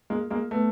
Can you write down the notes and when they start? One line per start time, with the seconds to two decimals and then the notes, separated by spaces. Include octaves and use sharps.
0.10 G#3 A#3
0.30 G#3 A#3
0.51 A3 B3